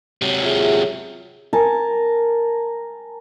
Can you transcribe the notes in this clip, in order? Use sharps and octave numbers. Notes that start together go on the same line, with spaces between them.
C3 F#3
F4 G#4 E5
A#4 G#5 A5